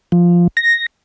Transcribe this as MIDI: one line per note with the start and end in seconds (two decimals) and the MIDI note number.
0.12 0.48 53
0.57 0.86 94